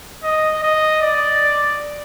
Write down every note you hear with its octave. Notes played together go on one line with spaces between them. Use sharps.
D#5
D#5
D5